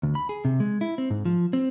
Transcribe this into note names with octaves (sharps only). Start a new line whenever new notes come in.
D2
B5
G#4
C3
G#3
E4
C4
G#2
F3
C4